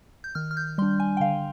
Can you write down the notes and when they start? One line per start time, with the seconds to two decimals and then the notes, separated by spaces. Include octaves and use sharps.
0.24 G6
0.35 D#3 F6
0.51 F6
0.57 G6
0.78 G3 D4 C6
1.00 G#5
1.17 G5
1.20 D3 F5